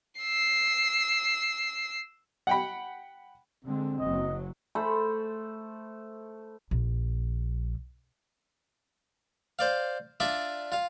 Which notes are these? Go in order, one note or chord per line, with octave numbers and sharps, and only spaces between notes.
E6 C7
F#5 G5 B5
D3 G#3 C4
F#1 F#3 D#5
A3 C5 B5
A#1
C5 D5 F5
D4 F4 D5 E5
F4 F5